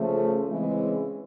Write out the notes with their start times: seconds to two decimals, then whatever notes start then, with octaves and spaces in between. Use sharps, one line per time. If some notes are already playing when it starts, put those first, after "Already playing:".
Already playing: C#3 F3 A3
0.47 C#3 E3 G#3 C4 E4